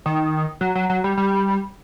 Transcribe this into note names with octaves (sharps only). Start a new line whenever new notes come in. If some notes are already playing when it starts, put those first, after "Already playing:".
D#3
F#3
F#3
F#3
G3
G3